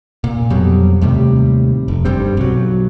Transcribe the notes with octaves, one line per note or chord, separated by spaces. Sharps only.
A#2
F2 B2 F#3 G3
D#2 A2 C3 G3
F1
G1 G2 G3 C4
B1 F#3